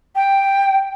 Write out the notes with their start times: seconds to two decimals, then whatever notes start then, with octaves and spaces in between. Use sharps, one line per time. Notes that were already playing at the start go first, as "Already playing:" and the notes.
0.15 G5